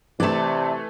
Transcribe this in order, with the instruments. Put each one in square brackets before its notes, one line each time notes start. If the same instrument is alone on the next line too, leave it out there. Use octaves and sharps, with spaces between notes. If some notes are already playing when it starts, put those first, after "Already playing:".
[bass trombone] C3 [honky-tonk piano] E3 A3 [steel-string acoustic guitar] D5 A5